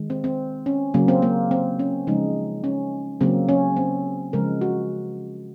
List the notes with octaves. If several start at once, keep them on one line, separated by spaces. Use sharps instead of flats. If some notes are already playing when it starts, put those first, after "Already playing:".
Already playing: D#3 G#3
C4
C4
C#4
C#3 F#3 A#3
C4
A#3
C4
C#4
C#3 F3 G#3 D#4
C#4
C#3 F#3 A#3 C4
C#4
C4
C#3 F3 G#3 A#4
F#4